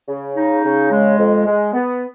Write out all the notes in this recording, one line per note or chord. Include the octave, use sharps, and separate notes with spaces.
C#3
D#4
C#3
G#3
F2
G#3
B3